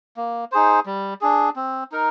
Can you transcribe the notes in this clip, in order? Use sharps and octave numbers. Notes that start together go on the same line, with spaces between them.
A#3
D#4 G#4 C5
G3
D4 G#4
C4
D#4 A#4